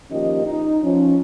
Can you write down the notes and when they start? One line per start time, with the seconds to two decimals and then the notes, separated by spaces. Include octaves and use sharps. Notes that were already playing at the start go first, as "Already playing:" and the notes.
0.10 A#2 D#3 F3 C#4 G4 D#5
0.45 D#4
0.83 F3 C#4